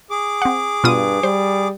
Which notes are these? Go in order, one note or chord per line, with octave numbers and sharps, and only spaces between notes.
G#4 D6
C4 F#5
G2 B2 F4 D#6
G3 C5